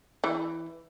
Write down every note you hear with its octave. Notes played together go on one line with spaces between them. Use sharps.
E3